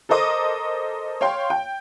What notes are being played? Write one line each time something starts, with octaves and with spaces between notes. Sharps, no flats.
A4 A#4 C5 D#5 D6 D#6
C#5 F5 G5 C6
G5